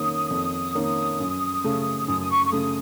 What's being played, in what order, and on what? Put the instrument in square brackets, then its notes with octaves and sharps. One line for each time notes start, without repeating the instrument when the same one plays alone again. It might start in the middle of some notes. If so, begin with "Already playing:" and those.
Already playing: [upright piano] F2 D#3 A#3 C#4 [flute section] D#6
[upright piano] F2
D#3 A#3 C#4
F#2
C#3 A3
[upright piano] F#2 [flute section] D#6
[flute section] D#6
C#6
C#6
[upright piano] C#3 A3 [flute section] D#6